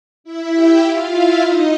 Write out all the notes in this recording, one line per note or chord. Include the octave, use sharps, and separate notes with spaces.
E4 E5
G4 G5
F4 F5
E4 E5
D#4 D#5